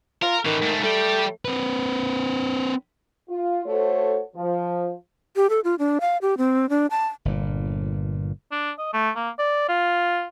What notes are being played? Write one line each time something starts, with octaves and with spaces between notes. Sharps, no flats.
F4 A#4
A2 D#3 E3
G#2 A3
G3 A3 G4
C4 B4
F4
A3 F#4 A4 C5 C#5
F3
G4
A4
F4
D4
F5
G4
C4
D4
A5
G1 A#2
D4
D#5
A3
A#3
D5
F4